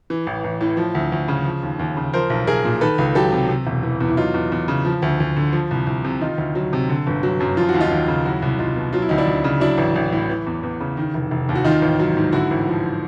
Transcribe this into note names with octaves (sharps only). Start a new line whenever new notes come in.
E3
A1
A1
A2
F3
D2
D2
C#3
F3
D#2
D#2
C#3
F3 A#4 C5
B1
B1 G#4 A#4
A#2
D#3 A4 B4
C#2
F#3 G4 A4
C3
C3
E1
E3
E2
E4
F#3 D#4 F4
E2
E2
C#3
F3
D2
D2
D3
F3
C2
C2
C3
D#3 D#4 F4
D2
F#3
C3
D3
G1
F#3
F#2
F3 F4
F#4
D#2
D#4 F4
D#2
C#3
F#3 E4 F#4
C2
C2 D#4 F4
B2
F#3 F4
E4
D2 D#4
D4 E4
D2
C#3
F#3 D4 E4
A1
A1
A2
E3
E2
E2
C#3
D#3
F1
F1
D#2
F#4
D#3 D#4 F4
A1
F#3
G#2
D3 E4 F#4
A1
F3